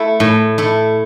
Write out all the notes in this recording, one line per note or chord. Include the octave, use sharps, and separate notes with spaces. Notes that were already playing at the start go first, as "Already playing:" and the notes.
Already playing: A3 E4
A2
A3 E4